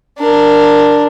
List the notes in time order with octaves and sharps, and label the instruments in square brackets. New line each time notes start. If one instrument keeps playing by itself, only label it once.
[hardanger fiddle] D4 A#4